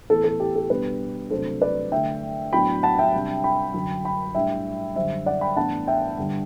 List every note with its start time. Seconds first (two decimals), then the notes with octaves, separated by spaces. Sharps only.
0.09 A2 E3 B3 A4
0.24 A4
0.40 G4
0.55 A4
0.70 B2 G3 B3 D4 G4 B4
1.30 C3 F#3 A3 D4 A4 C5
1.62 B4 D5
1.92 D3 A3 D4 E5 G5
2.53 A2 F#3 B3 D4 G5 B5
2.83 F#5 A5
2.99 E5 G5
3.14 C3 G3 D4
3.44 G5 B5
3.74 F#2 D3 F#3
4.05 G5 B5
4.35 A2 G3 D4 E5 G5
4.95 F#2 D3 G3 C5 E5
5.26 D5 F#5
5.41 G5 B5
5.56 A2 E3 B3 D4 F#5 A5
5.87 E5 G5
6.18 G2 D3 G3 D4